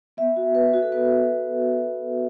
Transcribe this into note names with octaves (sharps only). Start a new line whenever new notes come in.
B3 E5
F#4
B3 B4
F#4
A4
B3 B4
B3